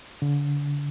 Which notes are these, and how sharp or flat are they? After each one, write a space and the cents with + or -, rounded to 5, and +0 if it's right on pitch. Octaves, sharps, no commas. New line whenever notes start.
D3 -35